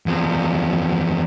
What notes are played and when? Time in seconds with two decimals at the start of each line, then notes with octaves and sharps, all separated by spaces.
0.06 E2 F3